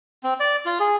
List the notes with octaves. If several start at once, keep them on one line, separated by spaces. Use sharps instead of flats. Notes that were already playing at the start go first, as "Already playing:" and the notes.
C4
D5
F4
G#4